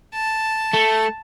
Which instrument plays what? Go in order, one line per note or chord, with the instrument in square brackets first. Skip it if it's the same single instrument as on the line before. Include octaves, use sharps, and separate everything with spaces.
[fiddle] A5
[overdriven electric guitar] A3